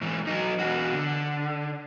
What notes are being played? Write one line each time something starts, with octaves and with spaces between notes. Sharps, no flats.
G#2 E3
F#3 D#4
E2 F#4
D3